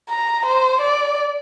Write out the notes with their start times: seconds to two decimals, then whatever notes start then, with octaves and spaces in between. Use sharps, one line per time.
0.10 A#5
0.45 C5
0.81 D5